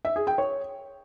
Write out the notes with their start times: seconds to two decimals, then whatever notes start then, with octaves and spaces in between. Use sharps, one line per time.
0.05 E5
0.16 G#4
0.27 G5
0.38 C#5